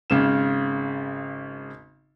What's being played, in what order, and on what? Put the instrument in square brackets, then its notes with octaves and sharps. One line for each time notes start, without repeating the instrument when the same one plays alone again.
[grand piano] G#1 C#3 E7